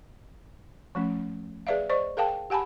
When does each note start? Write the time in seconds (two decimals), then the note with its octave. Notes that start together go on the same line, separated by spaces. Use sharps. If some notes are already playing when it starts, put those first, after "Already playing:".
0.95 F3 A3 C#4
1.67 G#4 B4 D5 E5 F5
1.90 C5 D5 D#5 C#6
2.17 G#4 A#4 F5 G5 A5
2.50 G4 F#5 G#5 A5 B5